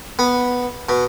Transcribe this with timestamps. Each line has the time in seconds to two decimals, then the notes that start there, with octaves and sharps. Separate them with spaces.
0.19 B3
0.89 B2